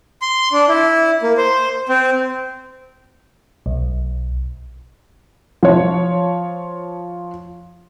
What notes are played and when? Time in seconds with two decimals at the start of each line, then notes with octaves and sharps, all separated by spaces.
0.22 C6
0.52 D4
0.69 E4
1.22 A#3
1.38 C5
1.89 C4
3.66 B1
5.63 F3 C#5